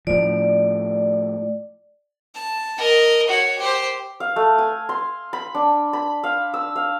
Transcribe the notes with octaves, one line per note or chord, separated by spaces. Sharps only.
A2 F3 D5
A5
A#4 D#5
F#4 C#5
G4 C5
F5
A3
G#5
C6
B5
D4
B5
F5
E6
F5